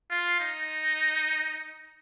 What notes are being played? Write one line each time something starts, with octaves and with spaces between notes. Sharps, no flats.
F4
D#4